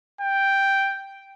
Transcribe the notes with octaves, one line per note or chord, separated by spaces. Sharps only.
G5